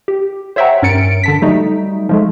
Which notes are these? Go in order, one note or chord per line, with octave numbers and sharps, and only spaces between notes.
G4
C5 C#5 E5 F#5 G5 A#5
G2 C#4 A#4 A6 C#7 D7
D3 A5 B6
F#3 G3 A3 D#4
F3 G#3 A3